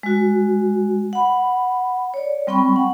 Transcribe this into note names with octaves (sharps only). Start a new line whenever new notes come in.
G#3 F#4
F#5 B5
C#5 D5
G3 C4 G5 B5 C#6
F#5